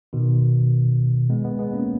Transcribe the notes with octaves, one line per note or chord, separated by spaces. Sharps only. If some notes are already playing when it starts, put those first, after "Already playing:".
B2 D#3
G#3 B3
G#3 B3
G#3 B3
A#3 C#4